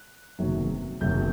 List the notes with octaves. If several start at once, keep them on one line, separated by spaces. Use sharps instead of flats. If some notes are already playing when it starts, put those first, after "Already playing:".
Already playing: F#6
F#1 E2 C3 D#3 F#3
F#1 E2 C3 D#3 F#3 G6